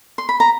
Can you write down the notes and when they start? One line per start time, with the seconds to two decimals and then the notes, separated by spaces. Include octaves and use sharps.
0.18 C6
0.29 B5
0.40 A#5